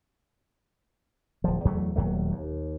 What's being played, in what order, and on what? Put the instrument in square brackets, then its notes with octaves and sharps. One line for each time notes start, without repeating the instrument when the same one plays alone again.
[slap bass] D1 F3
E2 F#3 A3
D#1 D#2 F#3 A3
D#2